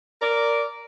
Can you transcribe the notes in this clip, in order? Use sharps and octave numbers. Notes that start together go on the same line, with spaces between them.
A#4 D5